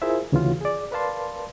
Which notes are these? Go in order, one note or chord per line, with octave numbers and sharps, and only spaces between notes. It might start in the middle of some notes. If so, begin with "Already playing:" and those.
E4 F4 G#4 A#4 C5 E5
D2 C#3 E3 C#4 F4 F#4
G#4 D5
A#4 B4 D5 F5 A5 C6